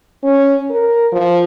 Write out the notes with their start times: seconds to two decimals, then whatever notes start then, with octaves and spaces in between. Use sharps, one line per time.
0.24 C#4
0.71 A#4
1.13 F3